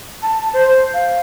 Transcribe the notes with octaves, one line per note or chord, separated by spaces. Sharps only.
A5
C5
F5